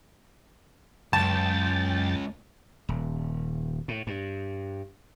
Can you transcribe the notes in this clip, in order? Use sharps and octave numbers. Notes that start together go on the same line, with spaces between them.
C#2 F#2 G5 A5 A6
D#1
A2
G2